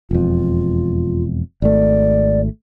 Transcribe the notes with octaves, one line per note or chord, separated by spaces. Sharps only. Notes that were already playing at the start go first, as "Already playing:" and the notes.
E1 F2 F4
G#1 A3 D5